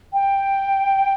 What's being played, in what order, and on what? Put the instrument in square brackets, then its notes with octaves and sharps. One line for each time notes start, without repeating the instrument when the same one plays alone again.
[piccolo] G5